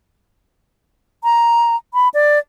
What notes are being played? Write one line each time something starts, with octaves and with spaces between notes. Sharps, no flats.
A#5
B5
D5